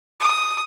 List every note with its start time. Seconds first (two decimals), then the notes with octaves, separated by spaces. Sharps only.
0.20 D#6